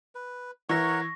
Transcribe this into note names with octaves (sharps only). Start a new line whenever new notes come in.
B4
E3 E4 A#4 C#5 E5 F#5 C#6 A#6